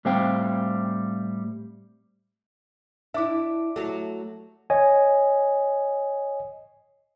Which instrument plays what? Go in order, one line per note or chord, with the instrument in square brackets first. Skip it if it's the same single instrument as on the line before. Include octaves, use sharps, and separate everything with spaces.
[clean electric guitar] A2 G3 C4 C5 F5 G5
[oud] D4 E4 [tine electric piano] E5 D6
[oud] F#3 A3
[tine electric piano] C#5 D#5 G#5